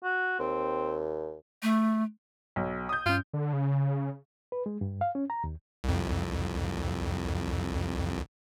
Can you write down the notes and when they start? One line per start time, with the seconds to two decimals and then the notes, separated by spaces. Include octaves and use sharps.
0.04 F#4
0.39 D#2 C4
1.63 A3
2.56 B1
2.89 D#6 G6
3.06 G2 C#4 F4
3.33 D3
3.53 C#3
4.52 B4
4.66 G#3
4.81 G2
5.01 F5
5.15 C#4
5.30 A#5
5.44 D#2
5.84 C2 F2